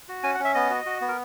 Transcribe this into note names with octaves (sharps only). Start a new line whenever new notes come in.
F#4
C#4 G#5
F#5
C#4
E5
B3 D#5
F#4
F#4
B3
A#4